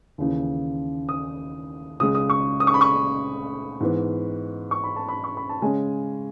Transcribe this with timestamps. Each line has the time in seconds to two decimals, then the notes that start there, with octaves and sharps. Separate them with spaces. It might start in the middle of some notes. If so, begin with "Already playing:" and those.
0.18 D#2 C#3 E3
1.09 D#6
2.00 C#2 C#3 G#3 D#6
2.15 D#6
2.30 C#6
2.60 D#6
2.67 C#6
2.74 B5
2.81 C#6
3.80 G#2 E3 B3
4.71 C#6
4.84 B5
4.96 A5
5.09 B5
5.24 C#6
5.37 B5
5.49 A5
5.62 C#3 G#3 C#4 G#5